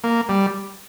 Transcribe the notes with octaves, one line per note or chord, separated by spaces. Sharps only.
A#3
G3